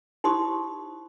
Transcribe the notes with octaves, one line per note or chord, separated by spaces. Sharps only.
D#4 E4 G4 C5 C6 D#6